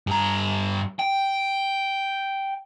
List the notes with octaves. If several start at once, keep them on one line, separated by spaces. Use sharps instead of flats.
G2 A#5
G5